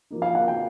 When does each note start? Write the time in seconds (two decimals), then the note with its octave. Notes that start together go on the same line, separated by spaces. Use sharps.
0.11 F3 A#3 D#4
0.22 F5
0.35 F#5
0.48 G5